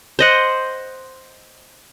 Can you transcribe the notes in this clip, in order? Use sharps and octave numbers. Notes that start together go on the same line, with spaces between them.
C5 D#5 F#5